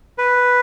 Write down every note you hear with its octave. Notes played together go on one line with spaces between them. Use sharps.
B4